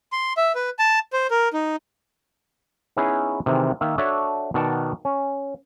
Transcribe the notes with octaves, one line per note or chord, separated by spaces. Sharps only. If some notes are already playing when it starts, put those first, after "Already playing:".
C6
E5
B4
A5
C5
A#4
D#4
B3 C#4 D#4 E4 G#4 B4
C3 D#3 E3 G#3
D#3 A#3 E5
D4 F#4 A4 C#5 E5
B2 D#3 D5 F#5 A5
C#4